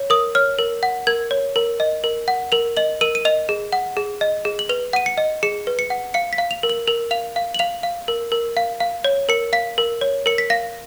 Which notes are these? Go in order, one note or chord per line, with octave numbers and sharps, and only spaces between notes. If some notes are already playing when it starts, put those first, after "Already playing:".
Already playing: C#5
A#4 D#6
C#5 F6
A#4
F#5
A#4 G#6
C#5
A#4
D#5
A#4
F#5
A#4 F7
D#5 F#7
A#4 D#7
D#7
D#5 F7
G#4
F#5
G#4
D#5
G#4
F#7
B4 F7
F#5 D#7
C#7
D#5
G#4 C#7
B4
C#7
F#5
F5 C#7
B6
F5
F7
A#4
F#7
A#4 F7
F5 F7
F5
F#7
F5 F7
F5
A#4
A#4
F5
F5
C#5
A#4 C#7
F5 B6
A#4
C#5
A#4 C#7
B6
F5 A#6